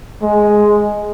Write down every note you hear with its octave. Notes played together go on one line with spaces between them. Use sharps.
G#3